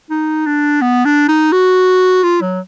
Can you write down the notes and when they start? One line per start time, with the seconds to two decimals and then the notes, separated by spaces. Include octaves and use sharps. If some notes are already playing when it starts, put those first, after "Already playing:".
0.10 D#4
0.46 D4
0.81 B3
1.05 D4
1.28 D#4
1.52 F#4
2.23 F4
2.41 F#3